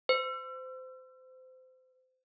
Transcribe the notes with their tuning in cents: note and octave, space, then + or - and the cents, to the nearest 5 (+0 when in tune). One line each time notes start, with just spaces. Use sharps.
C5 -25